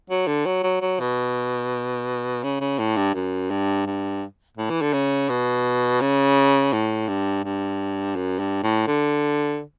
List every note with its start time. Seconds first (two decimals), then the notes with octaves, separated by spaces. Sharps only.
0.10 F#3
0.27 D3
0.46 F#3
0.63 F#3
0.81 F#3
0.99 B2
2.43 C#3
2.60 C#3
2.78 A2
2.96 G2
3.14 F#2
3.50 G2
3.86 G2
4.57 A2
4.70 E3
4.82 D3
4.93 C#3
5.29 B2
6.01 C#3
6.72 A2
7.08 G2
7.44 G2
8.15 F#2
8.39 G2
8.63 A2
8.87 D3